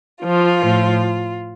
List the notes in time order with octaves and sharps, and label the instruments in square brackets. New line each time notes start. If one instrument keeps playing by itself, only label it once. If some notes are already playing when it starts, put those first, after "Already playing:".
[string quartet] F3 F4
A2 F3